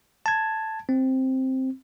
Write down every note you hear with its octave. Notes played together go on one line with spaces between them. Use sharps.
A5 G#6
C4